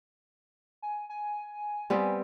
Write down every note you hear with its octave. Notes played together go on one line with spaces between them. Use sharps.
G#5
G#5
G3 B3 C4